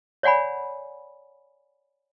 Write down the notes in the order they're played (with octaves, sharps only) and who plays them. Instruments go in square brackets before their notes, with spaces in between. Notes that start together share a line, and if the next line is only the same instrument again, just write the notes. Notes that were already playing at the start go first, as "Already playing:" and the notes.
[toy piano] C#5 D5 F#5 G#5 B5